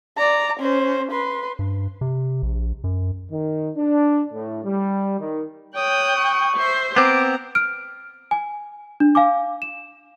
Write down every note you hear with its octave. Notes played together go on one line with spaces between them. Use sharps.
D5 A#5
C#4 C5
B4 C6
G2
C3
A#1
F#2
D#3
D4
A2
G3
D#3
C#5 G5 D#6 F#6
C#6
C5 E5
B3 C4 A#5 D6
F6 D7
G#5
D4
F5 G#5 D6
E7